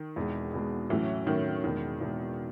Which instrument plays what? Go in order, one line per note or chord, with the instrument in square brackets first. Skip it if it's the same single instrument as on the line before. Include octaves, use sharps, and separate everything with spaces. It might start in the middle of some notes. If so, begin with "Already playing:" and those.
Already playing: [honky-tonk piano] D#3
[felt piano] E2 B2 G#3
E2 B2 G#3
[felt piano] A2 F#3 A3 C#4 [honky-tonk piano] E3
[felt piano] A2 F#3 A3 C#4 [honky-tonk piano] D#3
[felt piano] E2 B2 G#3 [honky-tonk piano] D#3
[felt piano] E2 B2 G#3